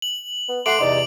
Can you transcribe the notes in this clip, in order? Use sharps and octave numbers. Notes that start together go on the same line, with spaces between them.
F#7
B3
A3 F#5 C6 D6 D7 F#7
E2 C3 D#4 D5